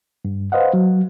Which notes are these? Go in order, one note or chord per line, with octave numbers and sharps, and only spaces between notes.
G2
B4 C5 D#5 F5 F#5
F#3